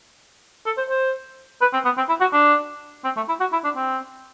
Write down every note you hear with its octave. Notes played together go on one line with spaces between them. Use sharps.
A4
C5
C5
B4
C4
B3
C4
E4
F#4
D4
C4
A3
E4
F#4
E4
D4
C4